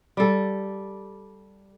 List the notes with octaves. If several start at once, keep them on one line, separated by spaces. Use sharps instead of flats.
G3 A4